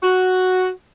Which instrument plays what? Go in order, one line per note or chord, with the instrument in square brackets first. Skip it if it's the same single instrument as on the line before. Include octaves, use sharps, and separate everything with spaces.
[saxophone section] F#4